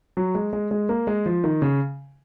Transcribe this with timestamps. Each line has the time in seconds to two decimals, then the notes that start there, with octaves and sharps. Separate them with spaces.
0.17 F#3
0.35 G#3
0.53 G#3
0.71 G#3
0.89 A#3
1.07 G#3
1.26 F3
1.44 D#3
1.62 C#3